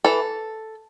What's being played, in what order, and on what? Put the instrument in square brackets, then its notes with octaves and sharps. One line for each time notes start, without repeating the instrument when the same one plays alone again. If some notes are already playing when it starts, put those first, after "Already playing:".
[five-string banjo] E3 A4